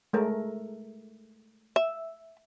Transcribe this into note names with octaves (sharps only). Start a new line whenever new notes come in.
G#3 A3 A#4
E5